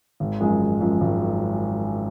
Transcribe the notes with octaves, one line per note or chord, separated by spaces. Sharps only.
G#1
F#2 F3 G#3
G#1
F#2 F3 G#3
G#1